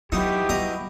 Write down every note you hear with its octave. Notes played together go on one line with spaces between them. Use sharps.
F#3 D#4 E4 F#4 G4 B4
G3 D#5 A#5